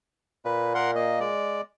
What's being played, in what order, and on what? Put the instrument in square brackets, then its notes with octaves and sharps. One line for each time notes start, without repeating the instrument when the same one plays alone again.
[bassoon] A#2 [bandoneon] B4
[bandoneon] A#4 F#5 C6
A#3 D#5
G#3 D5